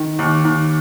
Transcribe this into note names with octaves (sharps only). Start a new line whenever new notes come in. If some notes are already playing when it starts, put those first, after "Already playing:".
Already playing: D#3
D#2
D#2